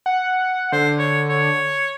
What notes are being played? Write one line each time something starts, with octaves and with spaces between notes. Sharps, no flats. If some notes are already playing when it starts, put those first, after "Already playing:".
F#5
D3 C5
C#5
C#5